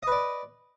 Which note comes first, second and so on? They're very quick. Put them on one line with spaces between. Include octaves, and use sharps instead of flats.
D#5 B4 D5